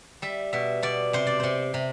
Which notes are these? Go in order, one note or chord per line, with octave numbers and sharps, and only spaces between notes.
G3 E5
B2 E5
B2 D5
C3 C5
D5
C3 C5
C3